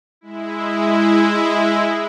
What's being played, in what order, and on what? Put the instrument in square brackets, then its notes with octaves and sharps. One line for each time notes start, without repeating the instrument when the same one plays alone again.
[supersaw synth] G#3 E4